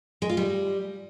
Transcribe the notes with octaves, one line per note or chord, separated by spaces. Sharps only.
G#3
F4
G3